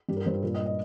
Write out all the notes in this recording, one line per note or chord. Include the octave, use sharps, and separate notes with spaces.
G2 G4
A#4
G2 C5
G4
A#2 A#4
D#5
D#5